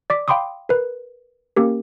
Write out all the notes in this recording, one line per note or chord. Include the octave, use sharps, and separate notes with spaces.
D5 D6 B6
F5 G5 B5 C6 D6 D#6
A#4 B4
A#3 C#4 G4 A#4